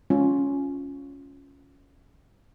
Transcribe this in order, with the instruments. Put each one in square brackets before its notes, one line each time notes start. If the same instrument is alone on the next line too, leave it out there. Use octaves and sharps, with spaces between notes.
[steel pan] G#3 C#4 F4